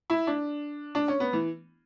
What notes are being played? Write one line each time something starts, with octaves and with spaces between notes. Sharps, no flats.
E4
D4
D4
C#4
B3
E3